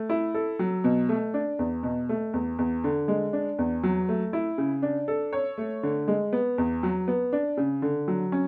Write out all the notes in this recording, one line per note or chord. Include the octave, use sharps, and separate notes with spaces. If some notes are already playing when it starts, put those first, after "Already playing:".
Already playing: A3
E4
A4
F#3
B2
A3
D4
E2
B2
A3
E2
E2
D3
G#3
D4
E2
F#3
A3
E4
C#3
D4
A4
C#5
A3
D3
G#3
B3
E2
F#3
B3
D4
C#3
D3
F#3
C#4